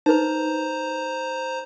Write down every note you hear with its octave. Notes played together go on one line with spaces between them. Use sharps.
D#4 B4 C5 A#5